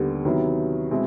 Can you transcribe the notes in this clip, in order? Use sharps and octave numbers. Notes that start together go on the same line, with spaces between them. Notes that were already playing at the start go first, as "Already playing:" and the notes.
Already playing: D#2 D3 G3 B3
C3 D#3 F#3 B3 E4
B2 G#3 C4 E4